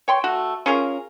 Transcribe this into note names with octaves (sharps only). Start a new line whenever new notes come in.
C#5 G5 C6
A3 F#4
C#4 F4 G#4 A#4